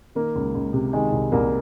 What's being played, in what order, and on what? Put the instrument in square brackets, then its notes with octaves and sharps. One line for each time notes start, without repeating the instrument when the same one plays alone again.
[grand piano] D#3 A#3
C#2
C#2
C3
D#3 G#3
C2
C2 A#3